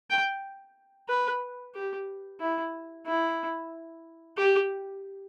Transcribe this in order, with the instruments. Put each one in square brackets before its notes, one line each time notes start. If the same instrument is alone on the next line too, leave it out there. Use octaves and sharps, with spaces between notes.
[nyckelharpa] G5
B4
G4
E4
E4
G4